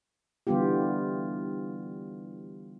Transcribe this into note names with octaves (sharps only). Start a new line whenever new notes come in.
D3 E3 G3 B3 F4 G4